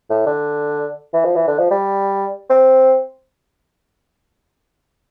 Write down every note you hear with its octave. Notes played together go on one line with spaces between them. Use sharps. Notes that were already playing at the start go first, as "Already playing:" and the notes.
A2
D3
E3
F3
E3
D3
F3
G3
C4